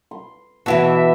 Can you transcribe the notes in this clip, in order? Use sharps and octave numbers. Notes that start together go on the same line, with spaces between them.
C6
B2 E3 E4 F#4 E5 A5